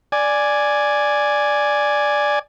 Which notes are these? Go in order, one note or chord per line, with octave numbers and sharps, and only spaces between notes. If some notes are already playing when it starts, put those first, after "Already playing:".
D5 G#5